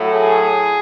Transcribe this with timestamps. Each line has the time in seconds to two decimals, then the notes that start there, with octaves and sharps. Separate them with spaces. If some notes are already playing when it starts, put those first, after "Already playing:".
Already playing: A2 F#3 A3
0.10 G#4